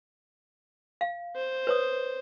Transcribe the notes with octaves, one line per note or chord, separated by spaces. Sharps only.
F5
C5
B4 C#5 D#6